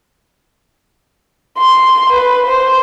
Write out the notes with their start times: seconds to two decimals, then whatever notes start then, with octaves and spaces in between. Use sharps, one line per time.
1.58 C6
2.10 B4
2.46 C5